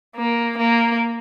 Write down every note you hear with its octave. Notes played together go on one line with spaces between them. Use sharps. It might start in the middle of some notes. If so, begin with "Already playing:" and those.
A#3
A#3